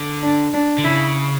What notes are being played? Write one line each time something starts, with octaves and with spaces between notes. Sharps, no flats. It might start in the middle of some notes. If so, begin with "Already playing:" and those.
Already playing: D3
D4
D4
D3
C#3 E4